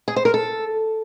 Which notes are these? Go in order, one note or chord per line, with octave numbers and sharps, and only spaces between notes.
G#4
C5
A#4
A4